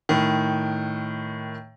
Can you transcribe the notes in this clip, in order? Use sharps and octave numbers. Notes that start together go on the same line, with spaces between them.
A2 D#3